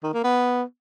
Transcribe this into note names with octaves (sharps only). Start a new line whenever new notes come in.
D#3
A#3
B3